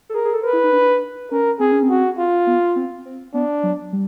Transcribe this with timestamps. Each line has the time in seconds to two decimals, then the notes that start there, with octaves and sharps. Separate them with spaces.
0.10 A4
0.14 G#4 A#4
0.25 G#4
0.34 A4
0.43 A#4 B4
0.53 E4
0.64 D#4
0.72 D4
1.31 C#4 A#4
1.60 C4 G#4
1.72 C#4
1.83 C4
1.89 F#4
2.18 F4
2.47 B3
2.76 C4
3.05 C4
3.34 B3 D4
3.63 F#3
3.93 G3